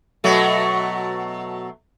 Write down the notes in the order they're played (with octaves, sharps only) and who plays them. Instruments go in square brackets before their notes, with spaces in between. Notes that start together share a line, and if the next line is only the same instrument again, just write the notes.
[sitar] B2 F#3 A3